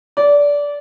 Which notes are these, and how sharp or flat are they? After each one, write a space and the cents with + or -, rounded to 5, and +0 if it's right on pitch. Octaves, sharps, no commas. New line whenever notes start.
D5 -20